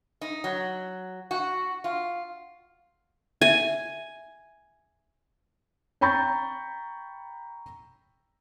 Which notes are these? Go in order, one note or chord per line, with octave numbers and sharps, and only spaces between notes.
D#4
F#3
F#4
F4
E5 G#5
G5 A#5 B5 C#6 G6 A6